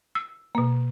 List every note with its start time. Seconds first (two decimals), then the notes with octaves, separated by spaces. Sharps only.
0.15 E6
0.55 B2 A#3